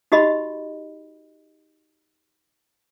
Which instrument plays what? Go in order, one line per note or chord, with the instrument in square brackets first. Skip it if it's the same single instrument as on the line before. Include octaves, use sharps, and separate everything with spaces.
[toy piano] D#4 F#4 G4 D#5 B5